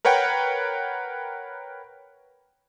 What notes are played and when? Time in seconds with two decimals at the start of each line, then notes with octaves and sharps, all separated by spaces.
0.05 A#4 B4 C#5 F#5 G5